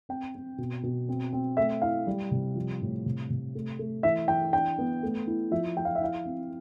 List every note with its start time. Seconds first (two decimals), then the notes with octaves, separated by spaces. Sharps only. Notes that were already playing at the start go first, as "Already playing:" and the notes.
0.09 C4 G5
0.35 C4
0.58 B2
0.83 B2
1.09 C4
1.33 C4
1.57 A3 E5
1.82 E4 F5
2.07 G3
2.31 C3
2.55 F3
2.81 A2
3.06 C3
3.30 C3
3.55 A3
3.79 A3
4.03 E3 E5
4.28 E3 G5
4.53 D4 G5
4.78 B3
5.03 A3
5.27 E4
5.51 F3 E5
5.77 F3 G5
5.85 F5
5.95 E5
6.01 E4 F5
6.25 C4